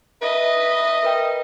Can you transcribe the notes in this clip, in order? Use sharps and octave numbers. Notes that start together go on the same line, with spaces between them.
B4 D#5 E5
A#4 B4 G5